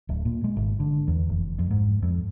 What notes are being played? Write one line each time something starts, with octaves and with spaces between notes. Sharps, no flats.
D1
A#2
G#3
G#1
D3
E2
F1
F2
G#2
F2